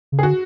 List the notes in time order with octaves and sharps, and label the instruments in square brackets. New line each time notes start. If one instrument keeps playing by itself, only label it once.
[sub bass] C#3
[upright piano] G#4
[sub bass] D3 [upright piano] F#4